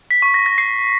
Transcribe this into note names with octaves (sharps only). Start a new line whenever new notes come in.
B6
C#6
A#6
A#6
C7